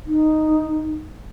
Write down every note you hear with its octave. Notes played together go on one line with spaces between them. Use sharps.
D#4